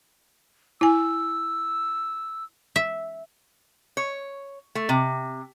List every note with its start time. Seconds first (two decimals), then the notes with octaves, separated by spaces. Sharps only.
0.81 E4 G#5 E6
2.76 E5
3.97 C#5
4.75 A3
4.89 C3